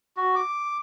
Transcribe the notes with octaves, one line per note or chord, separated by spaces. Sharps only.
F#4
D6